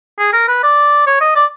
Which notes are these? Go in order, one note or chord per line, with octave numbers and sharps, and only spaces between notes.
G#4
A#4
B4
D5
C#5
D#5
D5